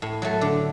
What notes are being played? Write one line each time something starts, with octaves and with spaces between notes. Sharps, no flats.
A2
F#3 A3
D3